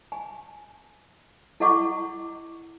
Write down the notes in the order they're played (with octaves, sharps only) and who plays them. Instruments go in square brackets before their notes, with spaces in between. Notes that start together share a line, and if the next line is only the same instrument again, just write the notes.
[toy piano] G#5
E4 A4 D#5 F#5 C#6 D6